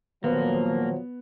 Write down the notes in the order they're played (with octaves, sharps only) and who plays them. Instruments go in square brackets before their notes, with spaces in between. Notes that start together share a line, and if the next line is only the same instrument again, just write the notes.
[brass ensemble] A#2 F3 F#3 [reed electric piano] D#3 C5 [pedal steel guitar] A#3 [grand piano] B3